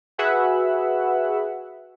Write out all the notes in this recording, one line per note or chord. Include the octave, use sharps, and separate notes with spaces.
F#4 G#4 B4 E5 F#5